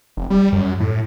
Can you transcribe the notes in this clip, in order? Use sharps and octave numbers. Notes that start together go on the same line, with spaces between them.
F1
G3
F#2
A2